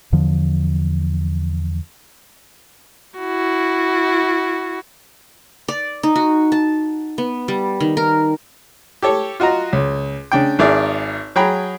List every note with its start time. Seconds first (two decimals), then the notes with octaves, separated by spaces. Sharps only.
0.12 E2 D3 F3
3.19 E4 F#4
5.68 D5
6.03 D#4
6.16 F#4
6.52 A5
7.18 B3
7.48 G3
7.80 D#3
7.97 A#4
9.02 G4 A4 C#5
9.40 F4 F#4 D#5 A#5
9.73 C#2
10.32 C#3 D4 G5
10.59 G#1 G#4 A#4 D5 E5
11.36 F#3 G#4 G5 A#5 B5